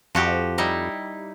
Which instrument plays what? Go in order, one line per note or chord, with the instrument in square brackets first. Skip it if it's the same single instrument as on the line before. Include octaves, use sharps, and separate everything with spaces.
[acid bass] F2 [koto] F3 F#4 G4
[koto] G3 D#4 E4